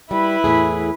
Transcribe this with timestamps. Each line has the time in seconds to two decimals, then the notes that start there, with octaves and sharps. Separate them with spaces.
0.11 G3 E4 B4
0.44 E2 A2 G#4